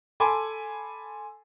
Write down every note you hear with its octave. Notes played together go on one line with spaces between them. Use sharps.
A4 G#5 B5 C6 D6